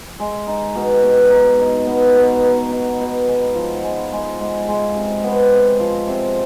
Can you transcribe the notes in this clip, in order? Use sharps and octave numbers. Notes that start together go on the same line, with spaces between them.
G#3
D#4
B2
B2
D#4
D#4
B3
B2
B3
D#4
B2
G#3
F3
G#3
G#3
G#3
G#3
C3
B3
C3
F3
C3